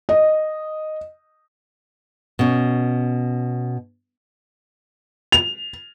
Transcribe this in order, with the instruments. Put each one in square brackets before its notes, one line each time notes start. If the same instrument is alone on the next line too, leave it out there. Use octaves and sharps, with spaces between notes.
[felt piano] D#5
[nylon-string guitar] B2 C#4
[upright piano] F7